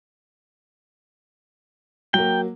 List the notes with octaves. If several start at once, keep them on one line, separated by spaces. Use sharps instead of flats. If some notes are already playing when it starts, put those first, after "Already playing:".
F#3 A#3 G5